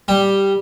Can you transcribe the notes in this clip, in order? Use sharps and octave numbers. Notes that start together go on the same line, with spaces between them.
G3